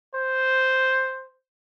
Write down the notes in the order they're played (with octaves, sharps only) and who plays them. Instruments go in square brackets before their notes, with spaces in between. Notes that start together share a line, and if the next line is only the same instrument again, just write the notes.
[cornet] C5